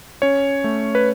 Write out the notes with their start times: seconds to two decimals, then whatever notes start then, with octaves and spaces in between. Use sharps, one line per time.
0.22 C#4 C#5
0.64 A3
0.95 B4